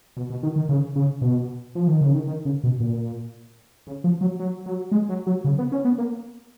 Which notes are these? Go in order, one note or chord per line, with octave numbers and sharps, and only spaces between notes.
B2
B2
D#3
D#3
C#3
C#3
B2
F3
D#3
C#3
D#3
D#3
C#3
B2
A#2
C#3
F3
F#3
F#3
F#3
G#3
F#3
F#3
C#3
B3
C#4
B3
A#3